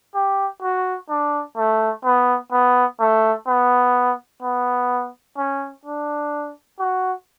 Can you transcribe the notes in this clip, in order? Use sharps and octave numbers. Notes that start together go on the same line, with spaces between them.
G4
F#4
D4
A3
B3
B3
A3
B3
B3
C#4
D4
F#4